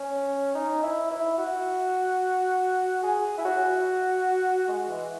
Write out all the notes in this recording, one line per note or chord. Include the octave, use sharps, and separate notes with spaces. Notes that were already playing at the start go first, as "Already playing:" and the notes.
Already playing: C#4
D#4
E4
E4
F#4
G#4
E4
F#4
G#3
E3